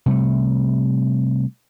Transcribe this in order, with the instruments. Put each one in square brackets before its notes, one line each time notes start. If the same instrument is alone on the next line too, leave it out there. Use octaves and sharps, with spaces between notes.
[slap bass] C3 G3 A3